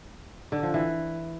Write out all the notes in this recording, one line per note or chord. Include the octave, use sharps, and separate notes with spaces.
D3
F3
E3